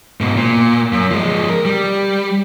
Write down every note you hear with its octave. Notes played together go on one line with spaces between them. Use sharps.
G#2 B2
A#2
F#2
F3 G#3
A#4
G3